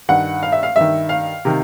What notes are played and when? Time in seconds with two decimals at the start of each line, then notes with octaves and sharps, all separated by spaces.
0.09 G2 D#3 F#5
0.43 F5
0.52 E5
0.63 F5
0.76 G2 D#3 E5
1.09 F5
1.45 C3 D#3